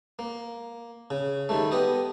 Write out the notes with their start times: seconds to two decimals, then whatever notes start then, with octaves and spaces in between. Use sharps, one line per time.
0.19 A#3
1.10 C#3
1.49 D#3 G3 A3
1.71 B3 G4 D#5